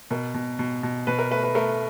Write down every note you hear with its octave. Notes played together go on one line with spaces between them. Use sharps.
B2 A#4
B2
B2
B2
B2 B4
A#4
A3 B4
B4
A3 A#4